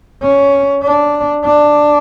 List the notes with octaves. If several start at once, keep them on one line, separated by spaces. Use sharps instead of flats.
C#4
D4
D4